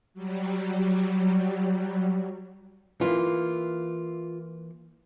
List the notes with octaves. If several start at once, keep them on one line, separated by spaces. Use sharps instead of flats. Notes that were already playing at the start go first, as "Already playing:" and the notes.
F#3 G3
E3 A#3 F4